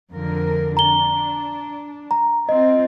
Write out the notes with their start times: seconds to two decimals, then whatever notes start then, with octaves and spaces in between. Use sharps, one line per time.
0.11 F2 D3 A#4
0.77 D4 A#5 G7
2.11 A#5
2.49 C4 F4 D#5